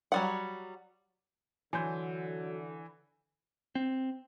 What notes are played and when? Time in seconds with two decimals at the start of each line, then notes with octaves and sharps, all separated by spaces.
0.12 F#3 G3 F#5
1.73 D3 E3 F#3 G#5 C6 G6
3.75 C4